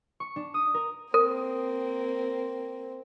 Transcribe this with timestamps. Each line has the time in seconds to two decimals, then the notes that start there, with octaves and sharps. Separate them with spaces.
0.20 C#6
0.36 D4
0.54 D#6
0.74 A#4
1.14 A#3 C4 A#4